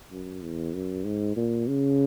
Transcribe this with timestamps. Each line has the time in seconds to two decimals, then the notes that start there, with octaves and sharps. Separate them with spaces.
0.12 F#2
0.43 E2
0.74 F#2
1.05 G#2
1.36 A#2
1.68 C#3